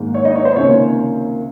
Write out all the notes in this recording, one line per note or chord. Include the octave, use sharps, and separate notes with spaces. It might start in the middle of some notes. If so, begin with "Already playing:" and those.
Already playing: G#2 D#3 A#3
C#5
D#4 D#5
C#5
C5
C#2 C3 D#3 A#3 C#5